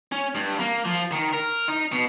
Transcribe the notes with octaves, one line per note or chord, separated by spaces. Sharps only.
C#4
G2
A#3
F3
D#3
A#4
D#4
B2